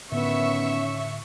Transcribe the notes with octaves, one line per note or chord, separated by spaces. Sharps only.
A2 D3 D#3 B3 C#4 E5 C#6